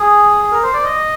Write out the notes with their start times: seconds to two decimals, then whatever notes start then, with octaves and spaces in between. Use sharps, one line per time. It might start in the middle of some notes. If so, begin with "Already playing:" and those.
Already playing: G#4
0.52 A#4
0.63 C5
0.73 D5
0.84 D#5